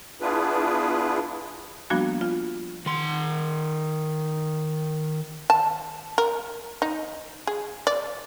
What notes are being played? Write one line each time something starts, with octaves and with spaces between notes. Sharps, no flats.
B3 D4 E4 F4 G#4 B4
F3 G3 A#3 B3 D4 F#4
F4
D#3 C6
A5
A#4
D#4
G#4
D5